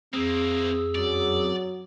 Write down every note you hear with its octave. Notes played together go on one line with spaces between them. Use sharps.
F2 E3 A#3 C4 G#4 E6
F#2 F#3 D5